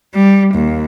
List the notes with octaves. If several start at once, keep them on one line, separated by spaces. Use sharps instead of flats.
G3
D#2